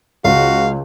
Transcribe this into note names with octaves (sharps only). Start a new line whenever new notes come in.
C#2 F#4 F5